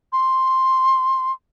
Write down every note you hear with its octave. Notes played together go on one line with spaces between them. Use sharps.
C6